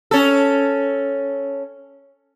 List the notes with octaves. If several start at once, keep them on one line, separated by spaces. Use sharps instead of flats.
C#4 A4